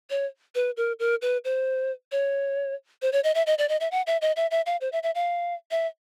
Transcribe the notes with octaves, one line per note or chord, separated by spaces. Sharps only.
C#5
B4
A#4
A#4
B4
C5
C#5
C5
C#5
D#5
E5
D#5
D5
D#5
E5
F#5
E5
D#5
E5
E5
F5
C5
E5
E5
F5
E5